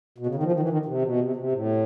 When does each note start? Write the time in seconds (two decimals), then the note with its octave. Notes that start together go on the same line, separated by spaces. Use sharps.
0.18 B2
0.27 C#3
0.35 D#3
0.43 F3
0.52 D#3
0.60 E3
0.69 D#3
0.86 C3
1.02 B2
1.19 C3
1.36 C3
1.52 A2